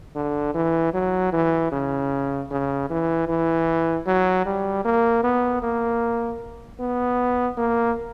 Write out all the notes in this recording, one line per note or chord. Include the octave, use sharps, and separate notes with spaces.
D3
E3
F#3
E3
C#3
C#3
E3
E3
F#3
G3
A#3
B3
A#3
B3
A#3